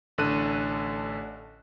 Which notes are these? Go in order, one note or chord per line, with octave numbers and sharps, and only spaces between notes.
A1 D3 A4 F#6 D#7